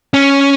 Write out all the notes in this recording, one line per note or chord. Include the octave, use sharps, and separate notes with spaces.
C#4